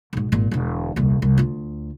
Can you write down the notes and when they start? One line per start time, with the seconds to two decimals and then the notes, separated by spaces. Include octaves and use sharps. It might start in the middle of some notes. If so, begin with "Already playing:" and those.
0.13 B1 G#2
0.32 G#1 A#2
0.51 E1 D3
0.96 D#1 C2
1.22 C2
1.38 D2 F4